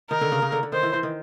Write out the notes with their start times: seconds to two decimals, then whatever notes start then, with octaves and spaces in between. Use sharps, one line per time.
0.10 D#3 A#4
0.21 D3
0.32 C#3
0.42 C#3
0.52 D3
0.63 D3
0.72 D#3 C5
0.83 E3
0.93 E3
1.03 D#3